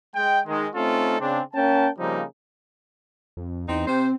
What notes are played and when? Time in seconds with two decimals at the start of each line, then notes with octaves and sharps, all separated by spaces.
0.15 G#3 G5
0.46 D#3 G#3
0.75 A3 C4 C#4 D#4 F4 A4
1.19 C#3 C4 D4
1.54 A#3 C#4 G5 A5
1.99 C#3 F3 G3 A#3 C4 D#4
3.37 F2
3.69 E2 C4 D#4
3.88 C3 C4 C5